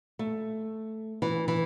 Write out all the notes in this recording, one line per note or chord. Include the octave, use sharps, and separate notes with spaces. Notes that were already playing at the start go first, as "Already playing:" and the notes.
A3
E3
E3